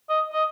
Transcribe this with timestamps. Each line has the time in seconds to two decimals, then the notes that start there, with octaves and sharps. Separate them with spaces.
0.09 D#5
0.33 D#5